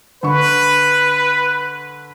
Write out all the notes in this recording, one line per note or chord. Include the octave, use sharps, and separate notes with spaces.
D3 B4 C#6